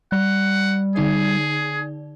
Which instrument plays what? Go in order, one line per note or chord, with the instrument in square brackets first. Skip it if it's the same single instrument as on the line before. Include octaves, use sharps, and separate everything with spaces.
[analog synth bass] G3 [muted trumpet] F#5
[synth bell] D3 D#4 D5 [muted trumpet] G#4